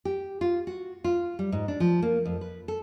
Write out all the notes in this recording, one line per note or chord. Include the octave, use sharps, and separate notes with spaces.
G4
F4
F#4
F4
G3
G#2
D4
F3
A#3
F2
B4
A4